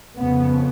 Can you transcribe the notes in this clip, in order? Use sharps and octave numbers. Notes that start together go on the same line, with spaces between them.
F2 C#3 B3